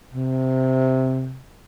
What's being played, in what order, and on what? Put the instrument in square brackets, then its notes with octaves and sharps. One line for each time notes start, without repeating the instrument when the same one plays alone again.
[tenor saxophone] C3